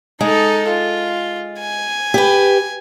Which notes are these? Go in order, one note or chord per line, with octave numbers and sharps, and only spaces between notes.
G#3 D#4 A4
F4
G#5
G4 B4